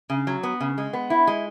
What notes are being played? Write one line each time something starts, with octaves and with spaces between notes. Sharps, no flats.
C#3
F#3
B3
C#3
G#3
B3
E4
G#3